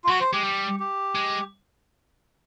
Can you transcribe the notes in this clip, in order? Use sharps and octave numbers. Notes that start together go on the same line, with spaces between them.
F4
F#3 F#4
C5
G#3 G4
G3
G4
G#3